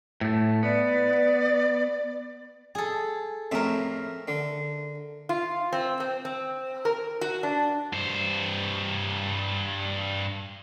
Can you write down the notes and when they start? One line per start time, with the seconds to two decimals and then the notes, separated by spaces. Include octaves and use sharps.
0.21 A2 A3
0.63 B3 D5
2.75 G#4 A4
3.52 F2 A2 A#4 E5
4.28 D3
5.29 F4
5.72 C4
6.00 C4
6.25 C4
6.85 A#4
7.21 F#4
7.43 D4
7.93 G2 C5